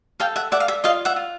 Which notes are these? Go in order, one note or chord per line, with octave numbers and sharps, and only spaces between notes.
A4 F5 G5
E5 F#5
D5 E5 F#5
F5
E5
F4 D#5 F5
E5 F#5
F4